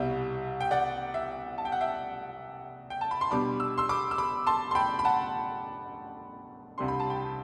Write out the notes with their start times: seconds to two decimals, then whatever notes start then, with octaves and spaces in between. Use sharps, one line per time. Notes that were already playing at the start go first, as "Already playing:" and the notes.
Already playing: C2 B2 G3 E5
0.61 G5
0.71 D5 F#5
1.14 E5
1.58 A5
1.65 G5
1.72 F#5
1.81 E5 G5
2.90 G5
3.01 A5
3.11 B5
3.21 C6
3.31 B2 G3 D4 B5 D6
3.60 E6
3.78 C6 E6
3.89 B5 D6
4.11 E6
4.18 B5 D6
4.47 A5 C6
4.71 C6
4.75 G5 B5
4.99 B5
5.05 F#5 A5
6.78 C2 C3 G3 D4 C6
6.88 B5
7.00 A5
7.10 G5 B5